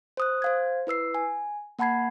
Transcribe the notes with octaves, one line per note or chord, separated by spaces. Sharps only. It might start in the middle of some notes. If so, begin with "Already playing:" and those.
C5 D#6 F#6
C5 F5 G#6
E4 B4 E6 C7
G#5
A#3 F#5 A5 B5 G#6 C7